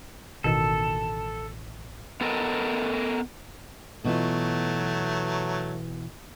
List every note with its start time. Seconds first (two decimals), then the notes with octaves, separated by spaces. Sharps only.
0.44 A1 B2 D#3 A4
2.21 B3 A4 A#4 D#5
4.04 B2 E3 F#3 A3 F4